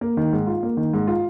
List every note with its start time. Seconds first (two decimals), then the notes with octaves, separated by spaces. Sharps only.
0.01 A#3
0.17 D#3
0.33 G#2
0.47 F4
0.63 A#3
0.77 D#3
0.93 G#2
1.08 F4